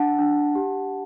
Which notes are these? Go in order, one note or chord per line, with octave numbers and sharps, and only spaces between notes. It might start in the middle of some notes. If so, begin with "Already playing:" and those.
Already playing: D4 F#5 A5
D4
G4